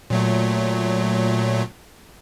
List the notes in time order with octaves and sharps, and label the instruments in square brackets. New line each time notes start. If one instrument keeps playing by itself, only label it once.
[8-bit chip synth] A#2 F#3 A3